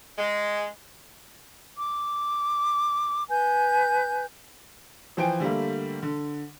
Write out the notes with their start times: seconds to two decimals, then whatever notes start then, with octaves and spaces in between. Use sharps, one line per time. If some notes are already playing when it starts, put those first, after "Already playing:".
0.18 G#3
1.78 D6
3.30 B4 G#5 G6
5.17 E3 F3 C5 G5 G#5 D7
5.40 D3 G3 A3 A#3
6.03 D3